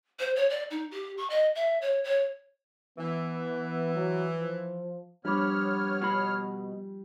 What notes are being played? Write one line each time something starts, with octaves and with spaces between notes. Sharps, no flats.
C5
C#5
D5
D#4
G4
C#6
D#5
E5
C#5
C#5
E3 B3
F#3
F3
F3 G3 B3 D4 C#5 B5 D6 F6
B2 F4 B5